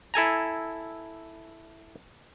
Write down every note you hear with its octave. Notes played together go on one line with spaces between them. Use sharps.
E4 A4 G#5 A#5